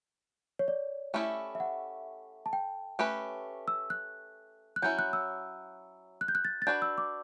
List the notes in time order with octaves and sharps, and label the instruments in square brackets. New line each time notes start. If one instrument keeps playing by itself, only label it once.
[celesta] C#5
D5
[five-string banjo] A3 C#4 E4 G4
[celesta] E5
F#5
A5
G5
[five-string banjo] A3 C#4 G4 B4
[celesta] E6
F#6
F#6
[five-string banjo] F#3 C#4 E4 [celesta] G6
[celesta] F#6
E6
F#6
G6
F#6
A6
A6
[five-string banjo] D4 F#4 B4 D5 [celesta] G6
[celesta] E6
D6